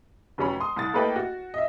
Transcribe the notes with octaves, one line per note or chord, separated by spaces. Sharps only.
F1 F#3 C#4 B5
C6 D#6
C2 D#6 A6
A3 A#3 A4 B4 D#5 G5
F#4
D#5 E5